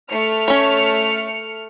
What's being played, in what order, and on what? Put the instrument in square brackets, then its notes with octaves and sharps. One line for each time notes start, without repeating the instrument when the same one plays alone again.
[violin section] A3 F6 C#7
[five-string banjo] C#4 C#5